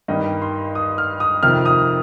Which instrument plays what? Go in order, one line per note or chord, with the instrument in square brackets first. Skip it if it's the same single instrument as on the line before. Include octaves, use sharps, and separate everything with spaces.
[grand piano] G2 D#3 G3 D#5
C6
D#6
F6
D#6
F2 C3 D#3 F6
D#6